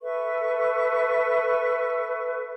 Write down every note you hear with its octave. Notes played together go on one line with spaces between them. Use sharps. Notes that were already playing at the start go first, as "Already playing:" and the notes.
A4 B4 E5 C#6